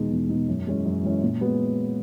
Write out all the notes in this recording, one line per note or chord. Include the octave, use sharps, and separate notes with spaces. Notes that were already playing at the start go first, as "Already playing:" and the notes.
Already playing: E2 B2 G#3 D#4
E2
B2 G#3 D#4
F#2
E3 G#3 C#4
F#2
E3 G#3 C#4
A#2
G#3 B3 F#4